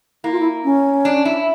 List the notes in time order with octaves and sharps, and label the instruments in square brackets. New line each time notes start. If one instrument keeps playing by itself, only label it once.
[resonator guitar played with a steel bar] A#3 [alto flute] E4
[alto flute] F4
E4
C#4
[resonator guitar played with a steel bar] D4
E4